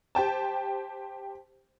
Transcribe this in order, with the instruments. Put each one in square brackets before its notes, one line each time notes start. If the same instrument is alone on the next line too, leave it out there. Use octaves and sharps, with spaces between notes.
[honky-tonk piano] G4 C5 G5 A5